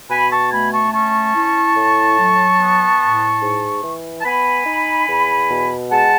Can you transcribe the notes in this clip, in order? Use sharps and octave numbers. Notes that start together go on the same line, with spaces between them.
B2 G#5 B5
A5 C#6
A3 G#5 B5
A5 C#6
C#4 A5 C#6
E4
A2
F#3
B3
A2
G#2
E3
A5
B3 G#5 B5
D#4
E2
B2
G#3 F#5 A5